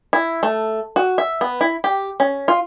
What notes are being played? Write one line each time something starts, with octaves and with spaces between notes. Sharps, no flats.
E4
A3
F#4
E5
B3
E4
G4
C#4
F4